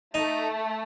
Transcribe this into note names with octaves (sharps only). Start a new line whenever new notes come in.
A3 D#4